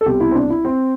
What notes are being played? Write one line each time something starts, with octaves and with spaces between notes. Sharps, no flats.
A4
C2 B2 G4
E4
C4
D4
E4
C4